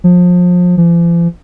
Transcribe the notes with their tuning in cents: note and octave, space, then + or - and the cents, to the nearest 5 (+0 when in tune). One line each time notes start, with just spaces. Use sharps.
F3 +30
F3 -45